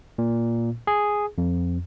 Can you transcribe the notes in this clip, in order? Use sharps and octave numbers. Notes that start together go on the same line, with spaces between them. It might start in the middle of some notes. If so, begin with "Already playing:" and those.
A#2
G#4
F2